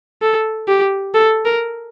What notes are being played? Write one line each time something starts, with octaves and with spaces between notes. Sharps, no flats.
A4
G4
A4
A#4